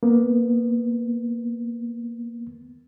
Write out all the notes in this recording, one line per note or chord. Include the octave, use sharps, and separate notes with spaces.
A#3 B3